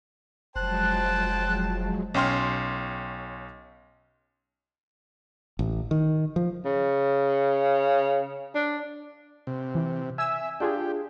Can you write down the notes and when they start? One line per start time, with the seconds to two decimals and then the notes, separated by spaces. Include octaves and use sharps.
0.56 F1 F3 F#3 G#3 C5 G5 A5 F#6
2.14 B1 C#4 G5 C6 F6
5.59 A1
5.91 D#3
6.36 F3
6.65 C#3
8.55 D4
9.47 C3
9.75 E3
10.18 E5 G#5 E6
10.60 D4 F4 G4 G#4